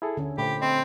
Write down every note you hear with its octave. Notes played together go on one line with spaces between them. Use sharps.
E4 G#4 A4
D2 D3 C#4
A#2 A3 G4 C5 B5
C4 D#5